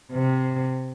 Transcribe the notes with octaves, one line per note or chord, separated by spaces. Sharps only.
C3